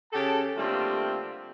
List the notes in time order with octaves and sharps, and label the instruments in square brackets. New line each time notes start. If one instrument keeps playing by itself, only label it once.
[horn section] C#3 G4 A4 G5 A5
D3 G3 A3 A#3 C4 F4